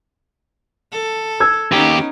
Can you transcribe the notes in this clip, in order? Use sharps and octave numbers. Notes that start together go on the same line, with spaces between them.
A4
E6 G#6
D#2 B3 C#4 D#4 G4